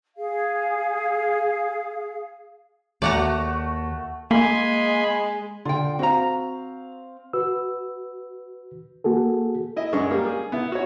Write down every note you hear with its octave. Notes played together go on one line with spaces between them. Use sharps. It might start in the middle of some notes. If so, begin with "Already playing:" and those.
G#4 F5
D#2 A3 F#4 D5 F#5 A#5
G#3 A#3 G#5 B5 C6
D3 F4 G5
C4 F#4 F5 A#5
F#4 B4 E6
A#3 F#4 G#4 A4
E4 D#5
F#2 G#3 D4 C#6
G3 A#3 D4
G#4
B3 E4
F#4 C#5